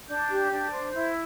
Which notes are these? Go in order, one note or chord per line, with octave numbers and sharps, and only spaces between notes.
D4 G6
G4
D4
C5
E4 G6